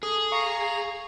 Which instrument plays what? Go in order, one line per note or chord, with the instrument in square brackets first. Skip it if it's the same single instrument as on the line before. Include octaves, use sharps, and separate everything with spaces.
[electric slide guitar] G#4 [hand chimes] A4 D#6
[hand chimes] F5 [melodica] A#5 [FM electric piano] C#6 C7